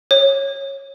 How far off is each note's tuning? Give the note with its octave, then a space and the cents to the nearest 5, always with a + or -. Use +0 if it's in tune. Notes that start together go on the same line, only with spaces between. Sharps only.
C#5 -15